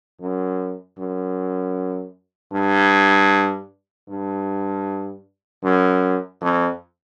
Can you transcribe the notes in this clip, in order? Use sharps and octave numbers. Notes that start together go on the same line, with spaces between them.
F#2
F#2
G2
G2
F#2
F2